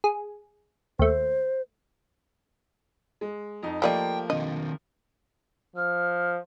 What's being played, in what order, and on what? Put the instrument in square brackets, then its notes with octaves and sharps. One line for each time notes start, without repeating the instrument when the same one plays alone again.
[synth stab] G#4
[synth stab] D#2 A3 [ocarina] C5
[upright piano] G#3
F2 D#4
[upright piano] F3 A3 A#3 [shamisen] G3 D5 D#5 [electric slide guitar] G5
[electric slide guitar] D#3 C4 D4 [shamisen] D#5
[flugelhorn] F3 [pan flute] F6